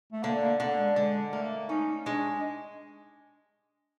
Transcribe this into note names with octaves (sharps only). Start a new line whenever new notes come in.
A3
D3 A#3
A#3
D3
G#3
D3 G#3
A3 A#3
C#4 D#4
G#3 D4